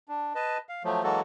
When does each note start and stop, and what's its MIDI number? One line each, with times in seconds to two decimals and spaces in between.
0.09 0.33 62
0.35 0.58 71
0.35 0.58 75
0.35 0.58 81
0.69 0.83 77
0.84 1.03 53
0.84 1.03 54
0.84 1.03 57
1.03 1.21 52
1.03 1.21 54
1.03 1.21 56
1.03 1.21 58
1.03 1.21 66
1.03 1.21 69